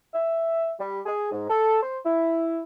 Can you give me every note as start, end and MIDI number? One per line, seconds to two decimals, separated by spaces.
0.13 0.71 76
0.78 0.98 55
1.06 1.31 68
1.32 1.48 44
1.48 1.78 69
1.82 1.99 72
2.05 2.63 64